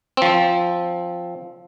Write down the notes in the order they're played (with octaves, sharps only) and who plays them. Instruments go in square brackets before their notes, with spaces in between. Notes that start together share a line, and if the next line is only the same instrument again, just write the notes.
[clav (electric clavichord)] F3 C4